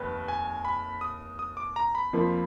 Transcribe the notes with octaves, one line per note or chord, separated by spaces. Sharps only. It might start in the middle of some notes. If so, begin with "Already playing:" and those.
Already playing: F1 D#2 B4
G#5
B5
D#6
D#6
D6
A#5
B5
F2 F3 A#3 F4